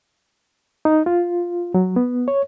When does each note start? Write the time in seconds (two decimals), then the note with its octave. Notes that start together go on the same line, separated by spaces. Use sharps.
0.85 D#4
1.06 F4
1.74 F#3
1.96 B3
2.28 C#5